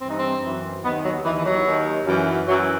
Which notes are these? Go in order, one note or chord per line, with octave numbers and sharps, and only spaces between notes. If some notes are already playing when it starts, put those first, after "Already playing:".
G2 E3 C4
D#4
C4
F#2 E3
D#2 D#3 B3
F#3
D#2 D#3 E3
E3
F#3
D#2 D#3
F#2 E3
F#2 E3 F#3